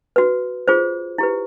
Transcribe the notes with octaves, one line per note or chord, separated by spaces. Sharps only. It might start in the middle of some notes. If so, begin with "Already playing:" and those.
F#4 B4
F4 G#4 C5
E4 G4 B4